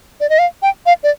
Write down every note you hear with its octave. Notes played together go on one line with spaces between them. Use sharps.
D5
D#5
F5
G5
F5
D5